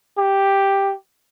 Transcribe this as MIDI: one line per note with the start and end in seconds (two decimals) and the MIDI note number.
0.18 0.94 67